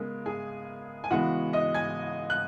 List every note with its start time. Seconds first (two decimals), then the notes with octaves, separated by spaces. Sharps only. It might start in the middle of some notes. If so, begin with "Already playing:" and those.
Already playing: C#3 G#3 B3 A#4
0.26 G#4 G#5
1.04 G#5
1.10 C#3 E3 G#3 B3 F#4 F#5
1.53 D#5 D#6
1.74 G#5 G#6
2.30 F#6